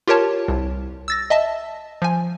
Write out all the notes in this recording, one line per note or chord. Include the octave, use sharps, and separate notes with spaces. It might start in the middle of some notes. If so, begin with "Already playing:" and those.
F4 G4 A#4 C#5 A5
C2
E6 A6 A#6
D#5 E5 A5
F3 G#5